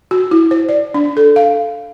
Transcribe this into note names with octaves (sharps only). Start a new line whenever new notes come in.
F#4
E4
C5
D5
D4
A4
F5